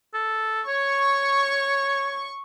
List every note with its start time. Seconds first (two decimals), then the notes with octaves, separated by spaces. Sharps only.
0.14 A4
0.67 C#5 C#6